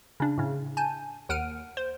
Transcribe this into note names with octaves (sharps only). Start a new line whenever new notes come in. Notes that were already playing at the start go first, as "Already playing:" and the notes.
C#3 D4
A2 C#3
G#5 A5 G6 D#7
D#2 F#5 F6 D7 D#7
C5